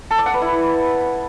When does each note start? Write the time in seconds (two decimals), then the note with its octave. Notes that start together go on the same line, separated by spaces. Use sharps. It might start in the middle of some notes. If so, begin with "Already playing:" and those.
0.11 A4
0.18 D5
0.26 F#5
0.34 B4
0.42 E4